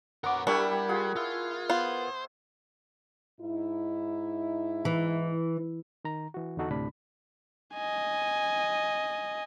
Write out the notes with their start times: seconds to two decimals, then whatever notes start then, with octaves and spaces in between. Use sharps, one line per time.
0.24 B3 A#4 C#5 F#5 D6
0.47 G3 D4 E4 G4 A#4 C#6
0.89 F4 G#4 F#5
1.16 E4 F4
1.69 B3 F4 C5
3.41 G#2 D#4 E4
4.85 E3
6.05 D#3 A#5
6.34 E3 F#4
6.57 E2 D3 D#4 F#4 A4 F#6
6.71 D2 A2 C3 D4 B5
7.75 D#5 G#5